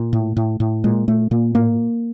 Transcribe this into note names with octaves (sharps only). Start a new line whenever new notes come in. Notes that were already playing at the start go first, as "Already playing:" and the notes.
Already playing: A#2
A2
A2
A2
A#2 G#3
A#2 A3
A#2 A#3
A2 A#3